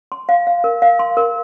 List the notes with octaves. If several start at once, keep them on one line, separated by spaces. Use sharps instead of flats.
C6
F5
F5
A#4
F5
C6
A#4